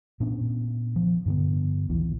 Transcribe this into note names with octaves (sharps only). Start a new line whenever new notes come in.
A#2 B3 C#4 D4
F3
G2 D3 B3
A#1 D#2 E3